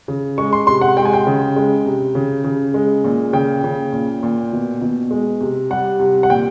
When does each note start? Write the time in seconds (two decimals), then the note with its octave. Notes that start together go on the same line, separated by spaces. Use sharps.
0.08 C#3
0.38 G#3 C#6
0.53 C6
0.67 C3 C6
0.81 F#5
0.97 G#3 G5
1.05 G#5
1.13 G5
1.27 C#3
1.56 G#3
1.86 C3
2.15 C#3
2.44 C#3
2.74 G#3
3.04 A#2
3.33 C#3 G5
3.64 C#3
3.93 A#2
4.23 A#2
4.53 B2
4.81 B2
5.11 G#3
5.41 C3
5.70 G3 F#5
6.00 C3
6.23 F#5
6.30 A#2 G5